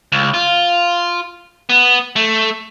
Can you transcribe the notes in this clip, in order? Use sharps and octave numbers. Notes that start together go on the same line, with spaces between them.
C#2
F4
B3
A3